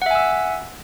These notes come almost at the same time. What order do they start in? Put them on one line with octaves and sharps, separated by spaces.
F#5 E5 G#5 E6